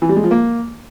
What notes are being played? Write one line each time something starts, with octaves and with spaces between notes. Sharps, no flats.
E3
G3
G#3
F3
A#3